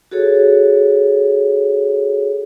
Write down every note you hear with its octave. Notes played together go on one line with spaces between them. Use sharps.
F#4 G#4 A4 C#5